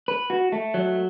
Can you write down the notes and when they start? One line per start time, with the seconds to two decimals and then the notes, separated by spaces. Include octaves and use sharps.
0.08 B4
0.30 F#4
0.52 A3
0.74 F#3